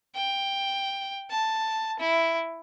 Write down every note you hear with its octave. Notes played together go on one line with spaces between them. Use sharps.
G5
A5
E4